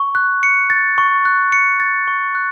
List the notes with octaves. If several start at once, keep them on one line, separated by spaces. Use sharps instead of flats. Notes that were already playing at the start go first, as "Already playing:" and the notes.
Already playing: C#6
F#6
C#7
A6
C#6
F#6
C#7
A6
C#6
F#6